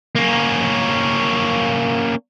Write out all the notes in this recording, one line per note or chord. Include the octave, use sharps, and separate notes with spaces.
A#3 C#4